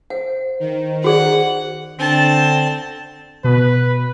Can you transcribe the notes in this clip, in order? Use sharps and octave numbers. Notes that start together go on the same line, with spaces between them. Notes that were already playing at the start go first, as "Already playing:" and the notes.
C5 F#5
D#3
F#4 G#4 D5 F#5
D3 C4 A5
B2 B4